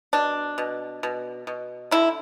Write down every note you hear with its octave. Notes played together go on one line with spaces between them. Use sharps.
B2 D4
B2
B2
B2
D3 E4